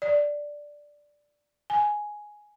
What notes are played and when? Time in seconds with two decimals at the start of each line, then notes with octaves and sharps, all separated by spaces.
0.02 D5
1.70 G#5